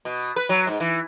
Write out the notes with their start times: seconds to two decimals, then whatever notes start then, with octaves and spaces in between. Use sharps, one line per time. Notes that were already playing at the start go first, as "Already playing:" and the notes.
0.05 B2
0.36 B4
0.49 F#3
0.67 G#2
0.80 E3